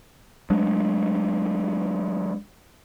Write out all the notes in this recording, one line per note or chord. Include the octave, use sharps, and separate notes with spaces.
F#3 G#3 A3 D4